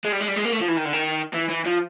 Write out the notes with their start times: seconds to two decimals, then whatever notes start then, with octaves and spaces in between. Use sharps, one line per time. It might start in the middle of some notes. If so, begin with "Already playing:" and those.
0.05 G#3
0.12 G3
0.20 G#3
0.28 G3
0.37 G#3
0.45 A#3
0.53 A3
0.61 F3
0.69 E3
0.77 D#3
0.85 D3
0.93 D#3
1.34 E3
1.49 E3
1.66 F3